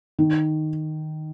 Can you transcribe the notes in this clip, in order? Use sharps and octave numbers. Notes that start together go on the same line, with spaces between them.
D#3